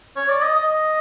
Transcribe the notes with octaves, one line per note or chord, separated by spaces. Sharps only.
C#5
D5
D#5
D#5